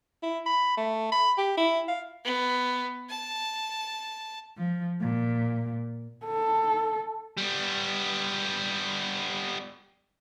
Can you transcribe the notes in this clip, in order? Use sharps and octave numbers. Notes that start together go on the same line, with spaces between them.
E4
B5
A3
B5
G4
E4
F5
B3
A5
F3
A#2
A4
G3 B3